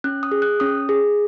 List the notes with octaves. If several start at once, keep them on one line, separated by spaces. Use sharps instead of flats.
C#4 F#6
D#6
G#4
F#6
C#4 D#6
G#4